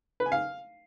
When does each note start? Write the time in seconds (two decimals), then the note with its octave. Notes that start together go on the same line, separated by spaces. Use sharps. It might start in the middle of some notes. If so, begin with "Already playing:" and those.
0.20 B4
0.26 G#5
0.32 F5